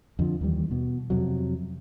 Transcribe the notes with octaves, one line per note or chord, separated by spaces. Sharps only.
F2 D3 F3
D#2 E3 F#3 G3
B2
F2 C3 F#3